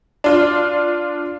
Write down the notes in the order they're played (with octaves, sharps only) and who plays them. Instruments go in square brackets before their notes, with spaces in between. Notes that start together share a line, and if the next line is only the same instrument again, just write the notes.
[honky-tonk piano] D4 F4